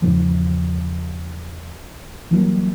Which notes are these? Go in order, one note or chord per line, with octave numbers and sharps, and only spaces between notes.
E2 G#2 C#3 F3
E3 F#3 G3 A#3